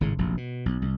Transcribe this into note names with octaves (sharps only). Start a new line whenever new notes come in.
G#1 A2 C#3
F1 A#1 F#2
B2
B1
C2